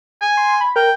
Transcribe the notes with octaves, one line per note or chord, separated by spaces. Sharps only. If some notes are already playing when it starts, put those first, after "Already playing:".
G#5
C6
B5
A#4 G5